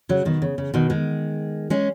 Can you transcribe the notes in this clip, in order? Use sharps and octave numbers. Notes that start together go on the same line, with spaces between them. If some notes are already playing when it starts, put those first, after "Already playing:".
C#3 F#3
B2 D#3
C#3
C#3
B2 D#3
D#3 G#3
G#3 C#4